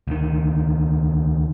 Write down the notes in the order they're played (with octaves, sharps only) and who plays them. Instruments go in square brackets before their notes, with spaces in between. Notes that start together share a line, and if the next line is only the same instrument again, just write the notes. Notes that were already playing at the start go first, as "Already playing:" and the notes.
[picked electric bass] D2 D#3